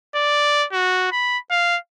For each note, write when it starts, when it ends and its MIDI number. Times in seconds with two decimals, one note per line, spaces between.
0.15 0.66 74
0.73 1.10 66
1.12 1.38 83
1.51 1.77 77